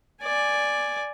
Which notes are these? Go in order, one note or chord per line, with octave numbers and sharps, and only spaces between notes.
D5 G#5